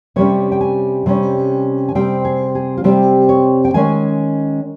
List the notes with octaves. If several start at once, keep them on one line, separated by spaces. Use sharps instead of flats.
C3 G3 C#4 C#5
G5
G#5
C3 G3 C#4
G#5
C3 G3 C4 G5
G#4
G#4
F4
C3 G3 C4 G4
C#5
G5
D#3 G#3 C#4 G#5